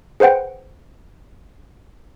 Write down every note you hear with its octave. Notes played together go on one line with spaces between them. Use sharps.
G#4 B4 C5 F#5 G5